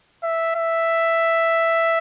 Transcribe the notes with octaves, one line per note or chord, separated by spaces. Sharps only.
E5
E5